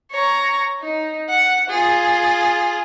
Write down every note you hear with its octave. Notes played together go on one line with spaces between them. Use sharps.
C#5 A#5
D#4
F#5
F4 G#4